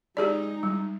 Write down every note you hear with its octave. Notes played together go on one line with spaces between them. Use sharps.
G#3 D#4 G4 G#4 D5
G3